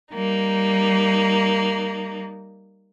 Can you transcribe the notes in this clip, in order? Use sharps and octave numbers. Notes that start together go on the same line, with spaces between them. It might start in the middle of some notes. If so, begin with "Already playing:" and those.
G3 A#3 D#4